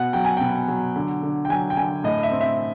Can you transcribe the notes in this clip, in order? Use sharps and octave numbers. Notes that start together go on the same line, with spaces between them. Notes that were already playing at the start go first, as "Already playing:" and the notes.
Already playing: B2 F#5
F#3 G5
G#5
B2 G5
F#3
D3
D3
G5
F#3 G#5
G5
D3 G#5
A2 D#5
E5
C4
E5